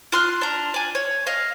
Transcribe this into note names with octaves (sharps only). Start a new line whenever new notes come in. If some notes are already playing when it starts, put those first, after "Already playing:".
F4 C6 F6 F#6
D4 A#5
D5 G#5
C#5
D#5 F5